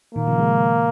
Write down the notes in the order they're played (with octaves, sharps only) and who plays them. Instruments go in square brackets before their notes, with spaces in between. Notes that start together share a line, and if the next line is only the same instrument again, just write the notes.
[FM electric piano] A#2 D#3 [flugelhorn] A#3
[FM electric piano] C#3 F3
D#3 G#3